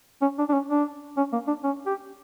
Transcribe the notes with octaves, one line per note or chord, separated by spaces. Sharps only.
C#4
D4
D4
C#4
D4
C#4
A#3
D4
C#4
G4